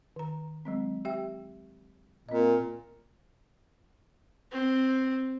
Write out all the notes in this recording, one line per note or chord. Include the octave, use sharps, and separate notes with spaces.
D#3 A#5
F#3 G#3 C4
G4 E5 G5
A#2 C4 D#5
C4